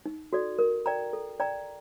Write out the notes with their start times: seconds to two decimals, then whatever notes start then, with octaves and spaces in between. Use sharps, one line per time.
0.06 D#4
0.33 F#4 A4 D5
0.59 A#4
0.86 D5 G5 A#5
1.13 A4
1.40 D5 G5 A#5